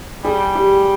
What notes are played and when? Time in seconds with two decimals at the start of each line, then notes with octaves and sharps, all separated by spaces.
0.25 G3 G#4
0.55 G4